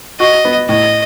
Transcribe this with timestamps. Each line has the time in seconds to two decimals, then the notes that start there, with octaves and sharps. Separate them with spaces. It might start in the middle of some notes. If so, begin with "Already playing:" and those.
0.20 F#4 D#5
0.45 B3
0.69 A2 D#5